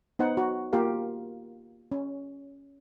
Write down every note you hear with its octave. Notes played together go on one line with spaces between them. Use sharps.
B3 D#4 C5 F#5
F#4
A#3 F4 G4 A#4 F5
C#4